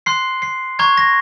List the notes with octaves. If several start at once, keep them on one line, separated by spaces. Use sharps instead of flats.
C6 F#6 C7
C7
A#5 C#6 F#6 G#6
A#6